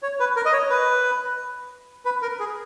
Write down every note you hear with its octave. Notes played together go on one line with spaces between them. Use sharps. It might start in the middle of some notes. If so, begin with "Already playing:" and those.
C#5
B4
A#4
D#5
C#5
B4
B4
A#4
G#4